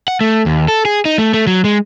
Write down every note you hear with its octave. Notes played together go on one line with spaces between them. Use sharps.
F#5
A3
D#2
A4
G#4
D#4
A3
A3
F#3
G#3